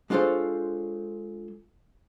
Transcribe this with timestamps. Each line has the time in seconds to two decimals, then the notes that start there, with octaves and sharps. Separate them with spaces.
0.10 G#3 D4 F4 A4 C5 C#5